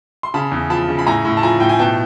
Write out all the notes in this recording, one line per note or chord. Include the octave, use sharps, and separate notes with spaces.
C6
C#3 A5 B5
E2
F3 A5 B5
C#3
B5
A2 G#5 A#5
A2
A5
F3 G#5 A#5
A2 G5
G#5
B2 G5 A5